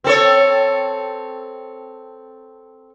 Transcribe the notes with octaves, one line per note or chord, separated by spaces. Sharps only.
C4 A4 C#5